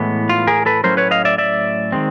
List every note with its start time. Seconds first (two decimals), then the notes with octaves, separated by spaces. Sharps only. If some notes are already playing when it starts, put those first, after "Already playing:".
Already playing: A2 E3 G#3 B3
0.29 F4
0.47 G#4 A#4
0.66 A4 B4
0.84 A2 F#3 A3 C#4 A#4 C5
0.97 B4 C#5
1.11 D#5 F5
1.25 D5 E5
1.38 D5 E5
1.92 D#3 G#3 C4